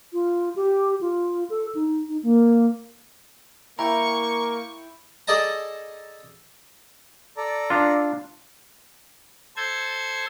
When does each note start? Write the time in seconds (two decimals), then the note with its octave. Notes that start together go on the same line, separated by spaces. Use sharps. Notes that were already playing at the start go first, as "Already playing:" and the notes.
0.13 F4
0.56 G4
1.01 F4
1.50 A4
1.75 D#4
2.08 D#4
2.23 A#3
3.79 A#3 E4 G5 A#5 C#6
5.28 G#4 A4 D5 D#5 A5 A#5
7.37 A4 D5 A#5
7.70 D4 F4
9.56 A4 C5 G#6